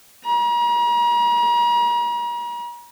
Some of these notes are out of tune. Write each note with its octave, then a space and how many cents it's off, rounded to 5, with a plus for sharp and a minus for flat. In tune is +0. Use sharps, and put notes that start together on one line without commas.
A#5 +40